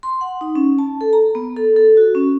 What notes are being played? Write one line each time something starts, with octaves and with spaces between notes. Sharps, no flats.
C6
F#5
D#4
C#4
A5
A4
A#5
B3
A4
A4
F#4
C#4